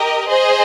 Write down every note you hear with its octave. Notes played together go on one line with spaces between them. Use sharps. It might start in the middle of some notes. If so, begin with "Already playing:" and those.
Already playing: G4 A#4 D#5
G#4 C5 D#5